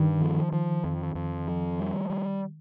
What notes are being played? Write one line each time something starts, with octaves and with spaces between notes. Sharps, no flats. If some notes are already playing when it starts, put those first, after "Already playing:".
Already playing: G2 D#3
F3
F3
F2
F2
F3
G3
G3